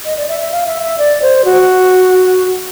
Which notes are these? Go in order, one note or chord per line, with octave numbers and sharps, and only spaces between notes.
D#5
D5
E5
E5
F5
E5
E5
D5
C5
F#4